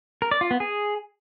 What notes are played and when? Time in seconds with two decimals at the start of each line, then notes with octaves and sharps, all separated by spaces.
0.22 A#4
0.31 D5
0.41 F4
0.51 B3
0.60 G#4